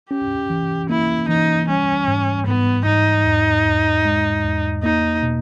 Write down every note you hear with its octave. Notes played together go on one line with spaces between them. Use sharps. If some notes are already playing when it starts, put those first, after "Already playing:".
C#4 G4
E3
A#3 E4
E3 D#4
G3 C#4
G#2
G#2 B3
G#2 D#4
E2
E2
G#3
E2
A#3 D#4
B2